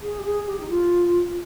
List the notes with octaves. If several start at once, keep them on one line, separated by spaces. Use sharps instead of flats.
G#4
G4
G#4
G4
D#4
F4